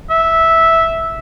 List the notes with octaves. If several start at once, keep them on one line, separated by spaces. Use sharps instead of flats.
E5